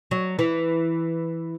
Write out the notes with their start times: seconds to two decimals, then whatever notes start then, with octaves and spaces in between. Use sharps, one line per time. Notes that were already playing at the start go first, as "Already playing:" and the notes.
0.11 F#3
0.39 E3